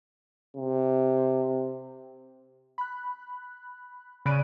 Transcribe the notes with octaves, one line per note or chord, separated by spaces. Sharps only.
C3
B5 F#6
C#3 D5 B5 F#6 D7 D#7